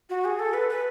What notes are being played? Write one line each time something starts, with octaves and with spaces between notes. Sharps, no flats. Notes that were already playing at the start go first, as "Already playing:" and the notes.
F#4
G#4
A4
B4
B4